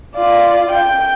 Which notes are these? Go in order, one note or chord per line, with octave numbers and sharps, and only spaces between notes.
F4 D5
G5